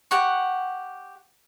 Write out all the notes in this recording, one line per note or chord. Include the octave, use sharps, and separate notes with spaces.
G4 F#5 C#6